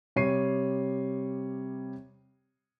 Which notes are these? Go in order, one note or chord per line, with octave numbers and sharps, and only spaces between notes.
C3 G3 C#5 C7 D#7